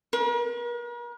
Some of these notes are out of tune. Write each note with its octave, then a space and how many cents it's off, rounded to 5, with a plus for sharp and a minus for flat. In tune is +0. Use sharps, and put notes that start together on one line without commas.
A#4 +45